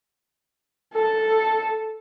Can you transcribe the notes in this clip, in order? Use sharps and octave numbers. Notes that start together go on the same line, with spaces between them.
A4